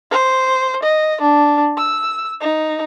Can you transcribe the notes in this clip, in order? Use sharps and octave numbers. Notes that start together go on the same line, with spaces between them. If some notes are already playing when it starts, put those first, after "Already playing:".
C5
D#5
D4
E6
D#4